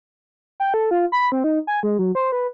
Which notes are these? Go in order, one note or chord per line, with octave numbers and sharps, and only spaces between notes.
G5
A4
F4
B5
C4
D#4
G#5
G#3
F#3
C5
B4